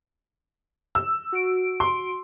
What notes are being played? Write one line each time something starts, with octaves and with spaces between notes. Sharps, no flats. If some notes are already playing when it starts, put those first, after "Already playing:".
E6
F#4 D7
C6